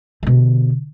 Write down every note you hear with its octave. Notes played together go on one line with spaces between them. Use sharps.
B2 D3